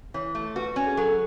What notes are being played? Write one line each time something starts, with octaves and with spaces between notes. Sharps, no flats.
E3 C#5
A3
F#4 B4
C#4
G#4
F#3 A4